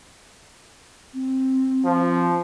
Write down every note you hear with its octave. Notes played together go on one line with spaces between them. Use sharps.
C4
F3